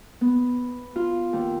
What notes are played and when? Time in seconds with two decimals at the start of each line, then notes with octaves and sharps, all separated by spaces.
0.21 B3
0.96 F4
1.33 D#2